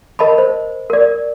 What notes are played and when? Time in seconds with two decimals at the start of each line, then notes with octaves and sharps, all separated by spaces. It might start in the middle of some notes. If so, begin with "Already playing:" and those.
0.19 A#4 D#5 A5 B5
0.38 C5
0.90 A#4 D5